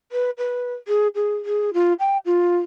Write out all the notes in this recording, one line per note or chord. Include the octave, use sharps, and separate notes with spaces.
B4
B4
G#4
G#4
G#4
F4
G5
F4